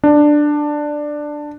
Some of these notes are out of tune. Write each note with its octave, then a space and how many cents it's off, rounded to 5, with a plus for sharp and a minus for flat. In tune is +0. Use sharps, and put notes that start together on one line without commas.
D4 +10